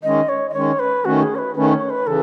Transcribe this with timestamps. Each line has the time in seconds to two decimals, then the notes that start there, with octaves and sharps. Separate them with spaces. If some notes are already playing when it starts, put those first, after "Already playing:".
0.03 D#3 G#3 C#4 D#5
0.29 C#5
0.49 D#5
0.54 D#3 G#3 C#4 C#5
0.79 B4
1.05 D#3 A3 C#4 F#4
1.22 G#4
1.35 C#5
1.38 B4
1.56 D#3 A3 C#4 B4
1.73 C#5
1.90 B4
2.06 C#3 E3 A4